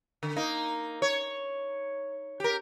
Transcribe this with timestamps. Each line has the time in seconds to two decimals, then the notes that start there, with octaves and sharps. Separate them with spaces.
0.23 D3
0.36 A#3 D#4
1.02 C#5
2.40 G4 A#4